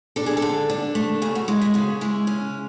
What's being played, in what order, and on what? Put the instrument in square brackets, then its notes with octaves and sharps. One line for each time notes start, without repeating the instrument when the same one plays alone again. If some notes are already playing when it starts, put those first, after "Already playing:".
[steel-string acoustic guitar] D4 A4
G#4
A4
D3
D4
A3
C#3 G#4
F#4
G#3 E4
E4
C#3 F#4
G#3 E4
C#4